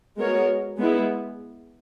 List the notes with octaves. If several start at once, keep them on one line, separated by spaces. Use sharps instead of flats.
G#3 B3 F#4 A#4 C#5
G#3 B3 E4